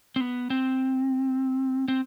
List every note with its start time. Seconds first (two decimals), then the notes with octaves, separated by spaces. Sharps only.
0.16 C4
0.21 B3
0.50 C4
1.88 C4